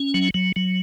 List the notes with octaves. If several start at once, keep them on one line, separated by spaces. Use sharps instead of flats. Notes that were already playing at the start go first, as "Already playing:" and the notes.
Already playing: C#4
F#3
F#3
F#3